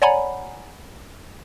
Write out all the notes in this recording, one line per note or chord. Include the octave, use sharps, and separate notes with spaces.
C#5 D5 F#5 G#5 A#5 B5